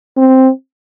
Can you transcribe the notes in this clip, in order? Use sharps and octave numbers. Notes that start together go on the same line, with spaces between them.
C4